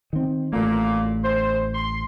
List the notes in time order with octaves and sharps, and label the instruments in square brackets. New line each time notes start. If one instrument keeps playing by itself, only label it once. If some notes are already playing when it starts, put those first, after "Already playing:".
[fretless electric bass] D#3 C4
[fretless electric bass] A1 A3 [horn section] A#2 A#3
[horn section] C5
C6